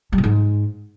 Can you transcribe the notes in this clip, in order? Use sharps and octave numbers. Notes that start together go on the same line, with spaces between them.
G3
A#2
G#2